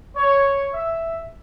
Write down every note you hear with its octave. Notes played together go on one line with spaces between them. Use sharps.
C#5
E5